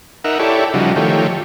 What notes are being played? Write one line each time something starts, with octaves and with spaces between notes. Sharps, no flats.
D#4 A#4 E5 F#5
E4 G4 A4 C#5 D5
C#3 F3 G3 D#4 F#4
D#3 F3 A3 G4 C#5